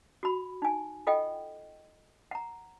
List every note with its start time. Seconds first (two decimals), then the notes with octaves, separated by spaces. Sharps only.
0.23 F#4 B5
0.62 D#4 G#5
1.07 F4 A4 D#5 F#5 G5
2.31 F#5 A#5